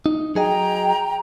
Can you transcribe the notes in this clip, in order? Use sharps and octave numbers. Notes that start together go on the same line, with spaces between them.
D#4
F#3 G#4 D#5 G5 A#5